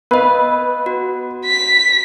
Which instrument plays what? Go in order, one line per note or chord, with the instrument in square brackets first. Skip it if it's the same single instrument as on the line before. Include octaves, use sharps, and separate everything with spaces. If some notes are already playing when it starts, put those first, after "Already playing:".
[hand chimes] B3 D#5 [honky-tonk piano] B4
[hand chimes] F#4
[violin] B6